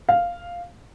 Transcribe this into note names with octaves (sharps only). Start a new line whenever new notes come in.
F5